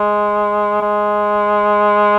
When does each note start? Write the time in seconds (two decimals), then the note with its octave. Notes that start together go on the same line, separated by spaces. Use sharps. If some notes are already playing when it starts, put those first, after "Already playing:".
Already playing: G#3
0.81 G#3